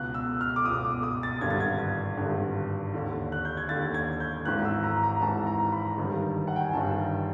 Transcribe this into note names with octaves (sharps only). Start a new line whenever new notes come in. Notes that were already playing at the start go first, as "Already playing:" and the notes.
Already playing: C#2 B2 F#6
E6
F6
D6
C#2 B2 D#6
D6
D#6
A6
G#1 G2 D3 G#6
A6
G#6
G#1 G2 D3
D#2 D3
F#6
G6
G#6
D#2 D3 A6
G#6
G6
G#1 G#2 E3 F#6
E6
A#5
A#5
G#1 G#2 E3 A5
A#5
B5
G1 G2 D#3
F#5
G5
G#5
G1 G2 D#3 A5